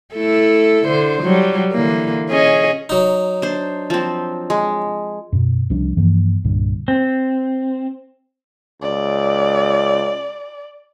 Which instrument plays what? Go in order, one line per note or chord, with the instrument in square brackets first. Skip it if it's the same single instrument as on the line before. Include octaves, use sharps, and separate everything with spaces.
[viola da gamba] A3 E4 A4
D3 C5
F#3 G3
D3 E3 A#3
C#4 G#4 D#5
[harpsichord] F#3 D#4
[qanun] D4 C5
F3 C4
G#3
[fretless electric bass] F#2 B2
C2 F3 D4
G2 E3 F3 A#3
C2 G2 A#2 D3
[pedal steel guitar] C4
[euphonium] C#2 [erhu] D5